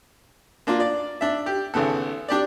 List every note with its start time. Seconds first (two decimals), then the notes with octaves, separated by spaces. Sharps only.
0.67 A#3 D4 F4
0.80 D5
1.21 D4 E5
1.46 G4
1.74 G#1 C#3 B3 A4
2.28 D4 G4 D5